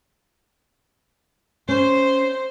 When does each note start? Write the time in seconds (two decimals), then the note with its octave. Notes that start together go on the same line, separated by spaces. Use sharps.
1.69 C#4 C5